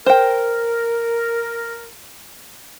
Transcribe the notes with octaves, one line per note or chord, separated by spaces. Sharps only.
A#4 C5 G5